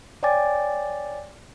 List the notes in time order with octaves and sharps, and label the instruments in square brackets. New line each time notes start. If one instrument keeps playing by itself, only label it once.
[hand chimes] C#5 D5 G5 G#5 D6 A6